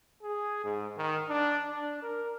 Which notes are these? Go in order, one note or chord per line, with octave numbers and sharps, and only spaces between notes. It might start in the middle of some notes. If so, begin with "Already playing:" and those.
G#4
G#2
D#3
D4
D4
A#4